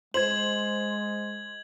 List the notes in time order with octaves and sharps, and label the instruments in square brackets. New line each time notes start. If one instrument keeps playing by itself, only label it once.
[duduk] G#3 [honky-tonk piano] C5 [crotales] G#6 F#7